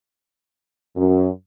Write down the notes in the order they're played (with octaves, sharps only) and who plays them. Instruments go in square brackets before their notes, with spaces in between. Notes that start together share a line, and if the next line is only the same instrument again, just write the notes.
[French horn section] F#2